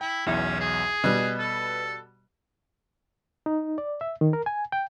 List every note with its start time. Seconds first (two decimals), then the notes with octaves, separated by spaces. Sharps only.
0.01 E4 G5
0.26 B1 E2 C#4 E4
0.60 G#4
1.04 B2 G3 B4 D#5
1.39 A4
3.46 D#4
3.78 D5
4.01 E5
4.21 D#3
4.33 A#4
4.46 G#5
4.72 G5